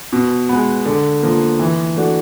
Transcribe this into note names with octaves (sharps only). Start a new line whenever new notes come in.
B2
G#3 B3
D3
F3 A#3
E3
A3 D4 F#4